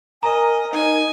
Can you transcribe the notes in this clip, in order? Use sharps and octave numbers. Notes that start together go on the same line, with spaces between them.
A#4 D#5 G#5 A#5
D#4 G#5